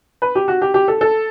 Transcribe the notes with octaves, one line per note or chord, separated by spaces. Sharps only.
B4
G4
F#4
G4
G4
A4
A4